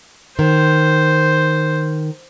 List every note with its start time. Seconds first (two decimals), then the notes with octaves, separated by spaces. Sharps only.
0.39 D#3 C5